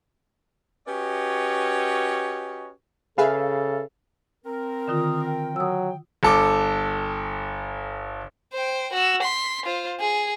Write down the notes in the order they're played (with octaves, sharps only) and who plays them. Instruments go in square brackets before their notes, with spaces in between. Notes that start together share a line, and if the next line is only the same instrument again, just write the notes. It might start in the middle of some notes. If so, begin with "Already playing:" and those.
[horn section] C#4 F#4 G4 B4 C#5 D#5
[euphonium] C#3 [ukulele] G#4 [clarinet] A4 [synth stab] B4 E5 F5
[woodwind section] C4 A#4
[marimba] D3 D#3 F4 [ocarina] D#6
[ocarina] G5
[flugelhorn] F#3 [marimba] D#6 E6
[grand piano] G1 A4 D6
[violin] C5 G5
F#4 E6
C6 B6
F4 C5
G#4